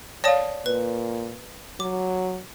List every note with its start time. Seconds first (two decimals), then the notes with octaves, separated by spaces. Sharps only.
0.24 C#5 D5 F5 A5 D#6
0.66 A#2 B4
1.80 F#3 D6